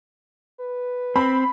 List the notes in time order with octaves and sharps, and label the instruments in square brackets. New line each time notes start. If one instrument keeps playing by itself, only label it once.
[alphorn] B4
[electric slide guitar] C4 [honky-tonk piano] B5